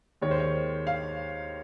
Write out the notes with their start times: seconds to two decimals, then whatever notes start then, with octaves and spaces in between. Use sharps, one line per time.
0.21 D#2 D#3 G#3 C#5
0.31 C5
0.40 C#5
0.87 F5